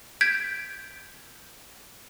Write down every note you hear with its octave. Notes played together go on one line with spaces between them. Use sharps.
G6 G#6 B6 D7